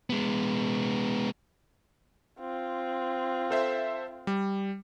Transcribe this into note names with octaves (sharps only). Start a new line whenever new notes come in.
G#3 B3
C4 F4
A4 C5 E5
G3